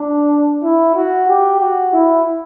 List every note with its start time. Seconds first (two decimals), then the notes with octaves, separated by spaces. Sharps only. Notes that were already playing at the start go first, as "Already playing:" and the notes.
Already playing: D4
0.63 E4
0.95 F#4
1.28 G4
1.60 F#4
1.93 E4